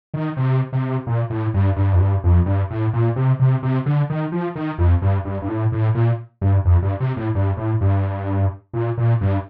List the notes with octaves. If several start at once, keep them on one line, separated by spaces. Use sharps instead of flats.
D#3
C3
C3
A#2
A2
G2
G2
F2
G2
F2
G2
A2
A#2
C3
C3
C3
D3
D#3
F3
D#3
F2
G2
G2
G2
A2
A2
A#2
G2
F2
G2
C3
A2
G2
A2
G2
A#2
A#2
G2